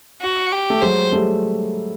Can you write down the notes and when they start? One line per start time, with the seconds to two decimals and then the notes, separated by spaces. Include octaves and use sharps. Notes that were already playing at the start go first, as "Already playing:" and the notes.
0.22 F#4
0.52 G4
0.70 A3
0.82 F#3 G#3 C5
1.12 G3 A3